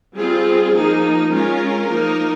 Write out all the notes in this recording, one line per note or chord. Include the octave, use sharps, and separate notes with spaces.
G3 C4 F4 G#4
F3 A#3 D#4
G#3 C#4 F4 A#4
F3 A#3 D#4